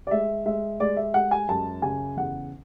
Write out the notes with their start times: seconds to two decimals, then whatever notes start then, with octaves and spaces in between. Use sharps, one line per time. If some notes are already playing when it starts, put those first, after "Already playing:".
0.07 D5
0.11 G#3 E5
0.46 G#3 E5
0.80 G#3 D5
0.96 E5
1.14 G#3 F#5
1.31 G#5
1.48 F#2 A5
1.82 C#3 G#5
2.17 E2 F#5